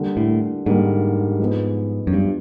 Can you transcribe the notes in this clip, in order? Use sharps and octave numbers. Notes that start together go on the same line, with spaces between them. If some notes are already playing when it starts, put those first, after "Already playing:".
Already playing: D3 G3 A#3
A2
G#2 D3 G3 A#3
F3 G#3 B3
F#2
G2 F3 G#3 B3